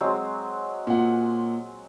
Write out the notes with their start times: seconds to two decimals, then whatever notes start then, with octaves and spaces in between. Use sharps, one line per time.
0.01 F#3 G#3 C4
0.87 A#2 F#5